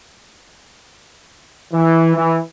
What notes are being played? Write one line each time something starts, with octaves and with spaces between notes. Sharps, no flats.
E3
E3